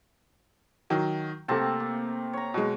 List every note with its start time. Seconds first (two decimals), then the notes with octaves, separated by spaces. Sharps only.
0.90 D#3 F#3
1.48 C3 A3 A#3 C4 A5
1.80 A#3
2.33 C#5 A#5
2.54 B2 G#3